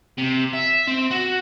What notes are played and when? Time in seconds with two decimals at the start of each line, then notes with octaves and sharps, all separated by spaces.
0.18 C3
0.54 E5
0.88 C4
1.11 F#4